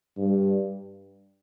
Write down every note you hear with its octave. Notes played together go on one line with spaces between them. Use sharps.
G2